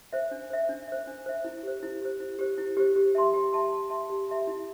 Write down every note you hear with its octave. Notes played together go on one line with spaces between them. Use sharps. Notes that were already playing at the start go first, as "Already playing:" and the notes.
C5 E5
D4
C5 E5
D4
C5 E5
D4
C5 E5
E4
G4 C5
E4
G4 C5
E4
G4 C5
E4
G4 C5
G4
E5 A5 C6
G4
E5 A5 C6
G4
E5 A5 C6
G4
E5 A5 C6
E4